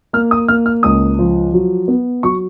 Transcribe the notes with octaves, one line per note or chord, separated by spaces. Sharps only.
A#3 F6
D#6
A#3 F6
F6
C#2 D#6
F3
F#3
B3
F#3 C#6